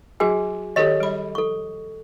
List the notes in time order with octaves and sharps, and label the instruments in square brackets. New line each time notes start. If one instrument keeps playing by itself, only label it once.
[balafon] F#3 [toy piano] F#4 G#4 G#5
[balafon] D#3 G4 C#5 [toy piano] A4 D#5
[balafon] G3 B5
[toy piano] A4 C#6